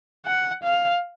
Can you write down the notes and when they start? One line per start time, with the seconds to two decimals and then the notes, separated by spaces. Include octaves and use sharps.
0.26 F#5
0.63 F5